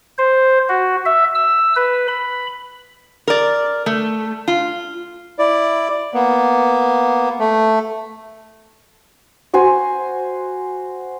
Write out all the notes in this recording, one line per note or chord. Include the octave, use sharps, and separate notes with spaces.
C5
F#4
E5
E6
B4
B5
A#4 D5
A3
F4
E4 D5
A#3 B3
A3
F#4 C5 G#5